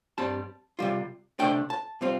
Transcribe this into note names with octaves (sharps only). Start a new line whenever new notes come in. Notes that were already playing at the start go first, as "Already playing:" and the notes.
G2 G3 C4 A5
C3 G3 F4
C3 A3 D4 G5
A5
C3 G3 C4 F4